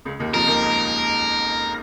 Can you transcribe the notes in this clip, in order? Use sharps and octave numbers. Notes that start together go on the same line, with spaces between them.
C#2 C#3
D#2 D#3
F2 F3 A#4
D#2 D#3
C#2 C#3